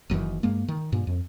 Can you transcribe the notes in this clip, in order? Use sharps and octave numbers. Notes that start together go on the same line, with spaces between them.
F#1 F#2 D#3 E3
G2 G#3 A#3
D#3
G2 A#2
F2